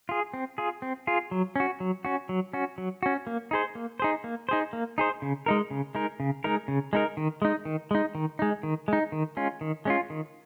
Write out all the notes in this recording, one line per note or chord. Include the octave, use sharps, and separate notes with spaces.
F4 G#4
C4
F4 G#4
C4
F4 G#4
F#3
C#4 F#4
F#3
C#4 F#4
F#3
C#4 F#4
F#3
C#4 F#4
A#3
D#4 G#4 C5
A#3
D#4 G#4 C5
A#3
D#4 G#4 C5
A#3
D#4 G#4 C5
C#3
G#3 D#4 A#4
C#3
G#3 D#4 A#4
C#3
G#3 D#4 A#4
C#3
G#3 D#4 A#4
D#3
G#3 D#4
D#3
G#3 D#4
D#3
G#3 D#4
D#3
G#3 D#4
D#3
G#3 C#4 F4
D#3
G#3 C#4 F4
D#3